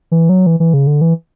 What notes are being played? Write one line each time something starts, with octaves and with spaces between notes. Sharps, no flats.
E3
F#3
E3
E3
C#3
D3
E3